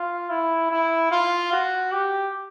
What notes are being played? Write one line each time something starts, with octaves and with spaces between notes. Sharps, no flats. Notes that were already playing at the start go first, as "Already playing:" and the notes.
Already playing: F4
E4
E4
F4
F#4
G4